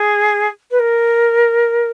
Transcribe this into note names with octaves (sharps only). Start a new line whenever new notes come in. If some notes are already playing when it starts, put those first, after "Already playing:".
Already playing: G#4
B4
A#4